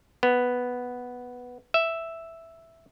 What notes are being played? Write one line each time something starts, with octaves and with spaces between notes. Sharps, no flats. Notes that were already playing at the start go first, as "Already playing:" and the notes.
B3
E5